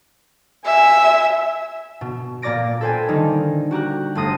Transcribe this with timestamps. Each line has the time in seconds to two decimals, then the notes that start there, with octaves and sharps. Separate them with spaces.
0.66 E5 G#5
2.01 B2
2.42 A#2 A#3 D5 D6 A#6 D7
2.81 A4 B4 C5 G5 G#5
3.08 D3 D#3 G3 D#4
3.71 F#4 G4 A#5 F#6
4.15 G1 A3 C5 D#6 A#6 C7